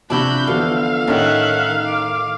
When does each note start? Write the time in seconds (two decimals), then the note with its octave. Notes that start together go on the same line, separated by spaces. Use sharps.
0.10 C3 F3 D4 E4 F#4 A5 B5 G6
0.47 D3 E3 F3 B3 F5
1.07 A2 D#3 C#4 D#4 E5 F#5 G5
1.87 D6